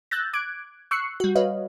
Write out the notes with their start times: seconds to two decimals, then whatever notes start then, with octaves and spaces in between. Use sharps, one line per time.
0.11 E6 F#6 G6 A6 A#6
0.33 D6 F#6 G#6 D7
0.91 C#6 E6 F#6 C7 C#7
1.20 G3 F#4
1.36 F#4 B4 C#5 D#5 F5